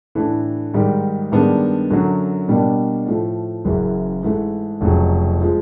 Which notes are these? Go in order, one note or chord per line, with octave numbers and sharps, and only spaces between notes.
A2 E3 A3 D4
G#2 D#3 G3
G2 D#3 G#3 B3 D4
F#2 D3 F#3
B2 G3 A#3 D4
A2 F3 A3
F#1 F#2 C#3 E3
G#2 E3 A3
F1 F2 C#3 F#3
F3 G#3